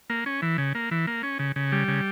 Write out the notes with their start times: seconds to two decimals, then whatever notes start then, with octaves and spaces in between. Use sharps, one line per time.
0.10 A#3
0.26 C#4
0.42 E3
0.58 C#3
0.75 A#3
0.91 E3
1.07 A#3
1.23 C#4
1.39 C#3
1.56 C#3
1.72 G3
1.88 C#3